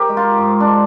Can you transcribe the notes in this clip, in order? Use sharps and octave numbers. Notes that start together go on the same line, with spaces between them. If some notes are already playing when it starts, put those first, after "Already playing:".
Already playing: G4 A#4 C5
G#3
F4
G#2
D4
G#3